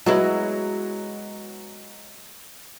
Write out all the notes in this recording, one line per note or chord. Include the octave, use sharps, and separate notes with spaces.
F#3 G#3 B3 E4